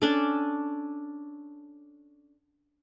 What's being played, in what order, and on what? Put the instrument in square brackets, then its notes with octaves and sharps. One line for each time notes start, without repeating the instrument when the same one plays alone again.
[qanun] C#4 D4 A4